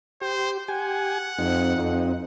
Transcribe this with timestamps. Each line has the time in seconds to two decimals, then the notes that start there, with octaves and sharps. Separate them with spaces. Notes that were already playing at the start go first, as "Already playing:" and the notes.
0.21 G4 C5
0.68 G4 F#5 G#5
1.39 F2 C4 D#4
1.76 F2